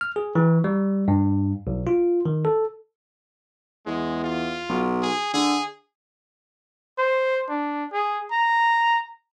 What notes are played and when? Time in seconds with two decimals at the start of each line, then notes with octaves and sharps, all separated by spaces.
0.01 F6
0.16 G#4
0.35 E3
0.64 G3
1.08 G2
1.67 B1
1.87 F4
2.26 D#3
2.45 A4
3.86 E2 G#3
4.24 F4
4.69 B1
5.03 G#4
5.33 D3 G#4
6.99 C5
7.50 D4
7.93 G#4
8.32 A#5